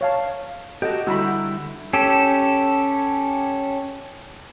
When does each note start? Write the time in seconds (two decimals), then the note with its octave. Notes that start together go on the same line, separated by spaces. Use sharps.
0.01 C#5 F5 A5
0.82 F#4 G4 A4 D#5 F#5
1.07 D3 G3 E4 F#4 A#5 B5
1.93 C#4 G4 A4